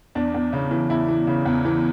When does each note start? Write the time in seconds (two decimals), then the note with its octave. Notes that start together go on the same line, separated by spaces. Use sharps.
0.15 E2 D4
0.34 E2
0.53 C#3
0.71 E3
0.89 E2 E4
1.09 E3
1.27 C#3
1.46 E2
1.65 E3